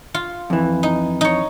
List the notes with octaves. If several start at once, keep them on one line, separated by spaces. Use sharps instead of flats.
F4
F2 E3
D#4
D#4 C#5